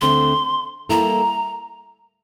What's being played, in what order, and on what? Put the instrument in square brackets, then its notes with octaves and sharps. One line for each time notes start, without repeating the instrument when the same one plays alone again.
[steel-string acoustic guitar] D2 D3 A3 C4 [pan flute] C6
[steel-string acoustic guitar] G3 A#3 E4 A4 [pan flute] A#5